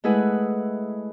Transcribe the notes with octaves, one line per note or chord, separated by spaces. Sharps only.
G#3 A3 E4 G#4 B4 F#5